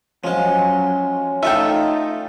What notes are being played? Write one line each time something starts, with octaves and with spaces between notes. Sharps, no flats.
F3 F#3 G#3 C#4
A3 D#4 F4 A4 E5 G5